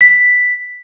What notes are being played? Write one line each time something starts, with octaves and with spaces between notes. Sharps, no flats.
B6